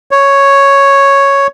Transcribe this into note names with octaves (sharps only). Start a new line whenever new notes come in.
C#5